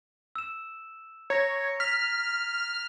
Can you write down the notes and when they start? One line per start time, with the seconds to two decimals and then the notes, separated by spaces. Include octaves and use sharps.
0.36 E6 E7
1.30 C#5 A#5 G#6 A#6
1.80 F6 B6